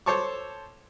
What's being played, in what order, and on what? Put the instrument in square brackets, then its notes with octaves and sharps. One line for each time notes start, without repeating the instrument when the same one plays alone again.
[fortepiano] A4 C5 C#5 A5 C#6 D6